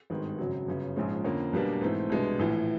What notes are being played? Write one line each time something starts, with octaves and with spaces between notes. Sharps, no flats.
G#1 G2 D#3 G#3 B3
G#1 F#2 C#3 F#3
G1 F#2 C#3
A#1 G#2 F3 G#3 C#4
F2 D3 F3 A#3 C#4
B1 B2 G3 A#3 D4
G#2 E3 A3 C4
C2 B2 G#3 B3 D4
A#1 A2 E3